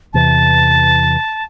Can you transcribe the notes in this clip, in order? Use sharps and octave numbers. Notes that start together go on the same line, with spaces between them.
E2 C3 E3 A5